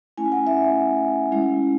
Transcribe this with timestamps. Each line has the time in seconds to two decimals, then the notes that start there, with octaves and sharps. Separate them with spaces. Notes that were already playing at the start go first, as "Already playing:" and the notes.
0.18 A3 C#4 E4 G#5
0.32 F#5
0.47 E5
1.32 G#3 C#4 E4